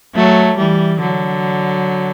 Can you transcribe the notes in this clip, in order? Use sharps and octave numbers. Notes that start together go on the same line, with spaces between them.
F#3 A3
E3 G3
D3 F#3